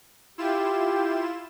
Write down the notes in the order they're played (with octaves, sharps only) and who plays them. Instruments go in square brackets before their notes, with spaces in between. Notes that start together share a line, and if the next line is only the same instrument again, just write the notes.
[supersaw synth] E4 F4 E7 [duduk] G4